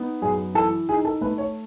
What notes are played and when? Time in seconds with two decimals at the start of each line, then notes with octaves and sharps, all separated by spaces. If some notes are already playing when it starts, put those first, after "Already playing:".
Already playing: B3 D#4
0.22 F#2 G#4
0.54 E3 A4
0.89 D#4 G#4
1.05 A4
1.21 A3 B4
1.38 C#5